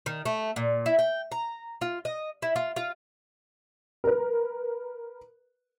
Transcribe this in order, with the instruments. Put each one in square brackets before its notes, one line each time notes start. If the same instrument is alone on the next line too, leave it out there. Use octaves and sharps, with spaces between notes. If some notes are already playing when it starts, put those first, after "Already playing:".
[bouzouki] D#3
A3
A#2
E4
G5
A#5
F4
D#5
E4
F4
F4
[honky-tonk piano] A#4 B4